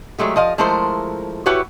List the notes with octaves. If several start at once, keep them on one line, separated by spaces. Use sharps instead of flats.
F#3 G#3 A3 G4
F3 D#5 F5
F3 G#3 A3 E4 A#4 C5
E4 F#4 G4 B4 C#5